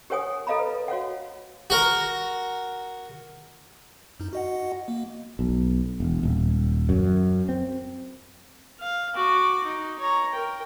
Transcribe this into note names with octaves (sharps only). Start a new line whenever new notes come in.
G4 A#4 C#5 F#5 G#5 D#6
A4 A#4 D#5 F5 A#5 B5
B4
F#4 C#5 F5 F#5
F#4 A#4
F#2 D#4
F#4 D#5 F#5
A#3
B1
E1
D#1
F#2
C4
F5
F#4 D6
D#4
C#5 A#5
A#4 G5